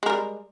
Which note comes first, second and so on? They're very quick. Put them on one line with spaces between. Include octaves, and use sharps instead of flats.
G#3 A#4 G3